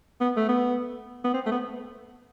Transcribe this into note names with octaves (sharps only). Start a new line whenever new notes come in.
B3
A3
B3
B3
C4
A3
B3